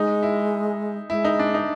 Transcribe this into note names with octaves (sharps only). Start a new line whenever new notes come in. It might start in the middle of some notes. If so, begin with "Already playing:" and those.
Already playing: G#3 D#4
E4
G#3 E4
D#4
D4
D#4